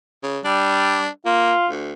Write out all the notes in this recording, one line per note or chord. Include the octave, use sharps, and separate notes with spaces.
C#3
G3 D4
A#3 F4
D2